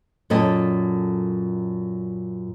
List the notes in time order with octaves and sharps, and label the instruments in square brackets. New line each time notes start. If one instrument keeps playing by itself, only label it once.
[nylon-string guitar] F#2 A#2 E4 A4 D#5 A5